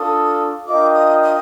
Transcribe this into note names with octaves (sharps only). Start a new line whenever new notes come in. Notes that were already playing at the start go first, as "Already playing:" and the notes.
Already playing: D4 F4 A4 D#6
D4 F4 A#4 D#5 G5 D6
D#6
D#6